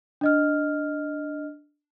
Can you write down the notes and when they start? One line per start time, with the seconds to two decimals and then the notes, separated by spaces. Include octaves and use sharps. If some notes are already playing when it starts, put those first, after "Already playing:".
0.21 D4 D#5 F6